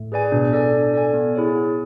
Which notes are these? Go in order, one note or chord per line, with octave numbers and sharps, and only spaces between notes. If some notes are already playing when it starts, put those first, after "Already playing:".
Already playing: A2
G#4 B4 D5 G#5
B2 D4
A4 D5 G#5
D4
A4 D5 G#5
B3
E4 G#4 C#5 G#5
B3